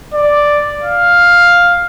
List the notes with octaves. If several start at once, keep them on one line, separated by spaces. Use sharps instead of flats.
D5
F5